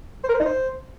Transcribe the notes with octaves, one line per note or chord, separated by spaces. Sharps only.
C5
A#4
C5
D#4
C5